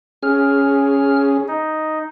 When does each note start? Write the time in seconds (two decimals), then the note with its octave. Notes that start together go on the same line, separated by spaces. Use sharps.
0.23 C#4 G#4 F6
1.48 D#4